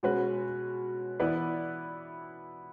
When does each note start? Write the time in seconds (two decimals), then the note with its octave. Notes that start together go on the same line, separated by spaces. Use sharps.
0.03 B2 G#3 C#4 F#4 B4
1.20 E3 B3 E4 B4 D5